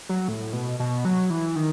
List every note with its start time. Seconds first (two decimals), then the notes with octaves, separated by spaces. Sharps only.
0.09 F#3
0.28 A2
0.53 B2
0.80 B2
1.05 F#3
1.30 E3
1.56 D#3